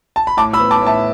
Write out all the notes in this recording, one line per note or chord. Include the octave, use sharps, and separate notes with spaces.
A5
B5
A2 A5 D6
B5 E6
B3
A5 D6
A2
E5 A5